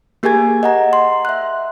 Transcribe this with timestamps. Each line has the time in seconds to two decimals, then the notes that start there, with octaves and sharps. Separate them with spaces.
0.23 A#3 G4 G#4 A#4 G#5 G#6
0.63 D#5 F#5 A#5
0.93 C6
1.25 E5 F#6